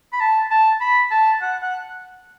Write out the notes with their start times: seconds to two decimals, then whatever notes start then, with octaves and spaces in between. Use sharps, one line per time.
0.13 B5
0.20 A5
0.51 A5
0.81 B5
1.11 A5
1.42 F#5
1.62 F#5